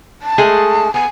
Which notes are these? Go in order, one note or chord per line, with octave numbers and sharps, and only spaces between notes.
A5
G#3 A3 G#4
B3 G#5